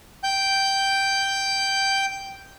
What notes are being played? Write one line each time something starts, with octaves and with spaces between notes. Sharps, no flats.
G5 G6